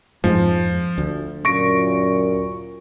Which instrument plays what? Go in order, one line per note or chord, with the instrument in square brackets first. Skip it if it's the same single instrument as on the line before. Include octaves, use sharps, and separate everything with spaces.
[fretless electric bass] F2 G#2 G#3 [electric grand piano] F3
[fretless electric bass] D2
[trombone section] F#2 A#2 [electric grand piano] C#6 A#6 D7